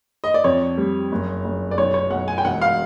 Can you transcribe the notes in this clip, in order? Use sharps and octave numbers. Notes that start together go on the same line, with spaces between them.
D#5
D5
F2 C#5
G3
F#1
F#1
D5
B1 C#5
C#5
B1 F#5
G#5
G5
E1 F#5
F5